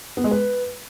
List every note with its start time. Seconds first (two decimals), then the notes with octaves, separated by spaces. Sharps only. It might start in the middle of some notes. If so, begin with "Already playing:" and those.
0.17 B3
0.24 G#3
0.31 B4